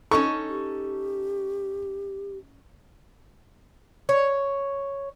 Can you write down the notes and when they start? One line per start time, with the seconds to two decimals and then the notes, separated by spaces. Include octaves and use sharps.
0.11 C#4 D#4 A4 C#6
0.49 G4
4.09 C#5